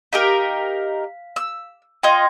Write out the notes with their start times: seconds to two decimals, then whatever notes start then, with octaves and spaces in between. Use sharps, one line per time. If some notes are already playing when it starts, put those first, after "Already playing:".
0.13 D#4 G4 A#4 F5 B6
1.36 E6
2.03 F4 D#5 G5 C6 G#6